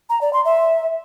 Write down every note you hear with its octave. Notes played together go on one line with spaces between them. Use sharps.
A#5
D5
C6
E5